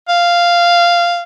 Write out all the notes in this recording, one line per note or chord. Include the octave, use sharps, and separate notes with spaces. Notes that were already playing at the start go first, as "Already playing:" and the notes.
F5